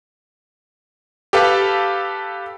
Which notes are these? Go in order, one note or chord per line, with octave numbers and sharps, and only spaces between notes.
G4 A4 B4 F5